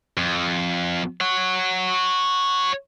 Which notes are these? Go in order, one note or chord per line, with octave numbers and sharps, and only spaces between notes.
F2
C#5 F#5